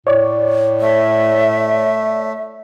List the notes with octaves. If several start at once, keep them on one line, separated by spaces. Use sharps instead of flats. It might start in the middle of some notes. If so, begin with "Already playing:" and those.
A2 C#5 D5
A3 E5